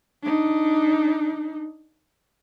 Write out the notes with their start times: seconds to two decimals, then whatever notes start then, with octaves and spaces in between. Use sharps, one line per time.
0.24 D4 D#4